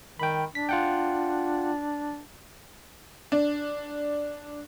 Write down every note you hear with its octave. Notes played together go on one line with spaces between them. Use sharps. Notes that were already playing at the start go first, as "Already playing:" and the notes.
D#3 G5 B5
D4 B6
F4 F#5 G5
D4